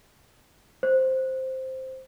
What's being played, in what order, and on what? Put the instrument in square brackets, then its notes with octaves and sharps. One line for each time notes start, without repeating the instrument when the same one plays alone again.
[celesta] C5